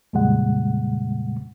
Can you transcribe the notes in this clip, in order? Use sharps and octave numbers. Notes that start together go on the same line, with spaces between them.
F2 A#2 C#3 G3 G#3 F#5